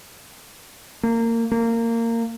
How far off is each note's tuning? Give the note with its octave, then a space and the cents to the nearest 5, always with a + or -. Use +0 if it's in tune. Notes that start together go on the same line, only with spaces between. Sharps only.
A#3 -25
A#3 -20